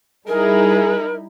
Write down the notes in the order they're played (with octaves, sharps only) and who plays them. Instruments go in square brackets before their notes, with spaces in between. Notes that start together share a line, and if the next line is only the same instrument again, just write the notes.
[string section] G3 D#4 E4 [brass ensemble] G#4 [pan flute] A#4